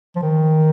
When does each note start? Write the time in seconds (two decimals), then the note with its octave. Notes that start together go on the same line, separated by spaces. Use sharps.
0.16 F3
0.22 D#3